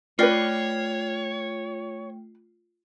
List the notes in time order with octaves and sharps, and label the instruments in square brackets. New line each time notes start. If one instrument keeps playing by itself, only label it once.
[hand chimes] A3 G5 [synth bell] F4 [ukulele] B4 D5 [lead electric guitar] C#5